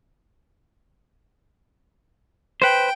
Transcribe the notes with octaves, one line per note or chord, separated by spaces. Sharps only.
B4 C5 G5